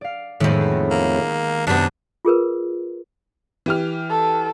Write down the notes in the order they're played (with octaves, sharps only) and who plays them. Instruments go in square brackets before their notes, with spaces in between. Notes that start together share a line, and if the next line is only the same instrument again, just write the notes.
[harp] D5 F5
[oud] F2 A2 [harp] D#3 G#3 B3
[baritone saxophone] A#3
[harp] F#2 [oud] C3 B3 [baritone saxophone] D4
[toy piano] F4 G#4 A#4 B4
[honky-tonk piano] E3 G4 F6
[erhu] A4